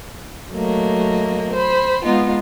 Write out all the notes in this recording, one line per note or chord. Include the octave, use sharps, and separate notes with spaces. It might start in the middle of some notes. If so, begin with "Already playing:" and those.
F#3 A3 A#3 D#5
C5 B5
G#3 B3 D#4 F4